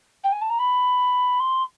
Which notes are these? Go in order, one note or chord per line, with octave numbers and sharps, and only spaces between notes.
G5
G#5
A5
A#5
B5
C6